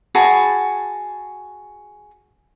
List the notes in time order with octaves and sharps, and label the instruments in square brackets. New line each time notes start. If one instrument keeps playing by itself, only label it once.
[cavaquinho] F#4 G#4 A5 B5